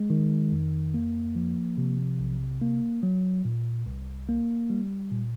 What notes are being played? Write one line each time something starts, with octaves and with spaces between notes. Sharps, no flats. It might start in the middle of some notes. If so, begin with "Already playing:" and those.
Already playing: G#3
D#3
F2
A#3
F3
C3
B1
A#3
F#3
A#2
C2
A#3
G3
A#2